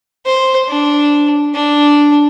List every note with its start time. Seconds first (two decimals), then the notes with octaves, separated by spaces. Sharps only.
0.26 C5
0.69 D4
1.54 D4